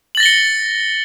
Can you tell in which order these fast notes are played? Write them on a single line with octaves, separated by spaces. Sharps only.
F#7 A6 A#6 G7 C#7